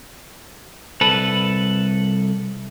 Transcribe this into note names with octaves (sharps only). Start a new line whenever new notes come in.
C2 A4 B4